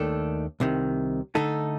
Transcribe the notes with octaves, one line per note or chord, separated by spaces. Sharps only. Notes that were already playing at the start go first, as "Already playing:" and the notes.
Already playing: D#2 D#3 A3 D4 A4
C2 C3 D#3
D3 A3 D#4 A4